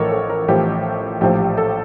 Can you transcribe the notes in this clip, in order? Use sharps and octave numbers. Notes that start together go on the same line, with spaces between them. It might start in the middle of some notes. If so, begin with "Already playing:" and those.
Already playing: A1 A2 F3 A4 A#4 C#5
A4
A#4
A1 A2 F3 G4
A#1 A2 F3 G4
G4
A4